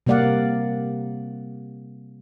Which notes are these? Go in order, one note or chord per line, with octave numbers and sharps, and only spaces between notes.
C3 G3 A#3 D5 F5 F#5